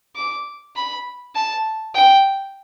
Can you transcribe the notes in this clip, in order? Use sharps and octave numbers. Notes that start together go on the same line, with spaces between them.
D6
B5
A5
G5